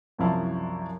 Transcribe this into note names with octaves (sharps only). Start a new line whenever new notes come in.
C2 F#2 F3 E4 F5 A5